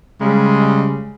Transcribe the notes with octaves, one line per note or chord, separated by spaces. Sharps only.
C#3 G3 G#3